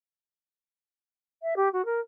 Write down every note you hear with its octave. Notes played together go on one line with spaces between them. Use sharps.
E5
G4
F#4
A#4